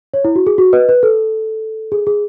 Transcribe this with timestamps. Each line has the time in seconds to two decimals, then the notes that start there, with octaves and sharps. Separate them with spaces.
0.14 C#5
0.24 E4
0.36 F#4
0.47 G#4
0.58 F#4
0.73 B4 D#5
0.89 B4
1.03 A4
1.92 G#4
2.07 G#4